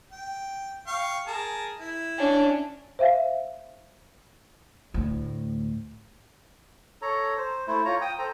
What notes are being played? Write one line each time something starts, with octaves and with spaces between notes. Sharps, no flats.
G5
F5 G5 C#6
G#4 A#4 A5
E4
C#4 D4
C5 E5 F5
D2 A2
A4 C#5 A#5
C5
A3 E4 C5
F4 C#5 A#5
G5 D#6
A4 C5 A#5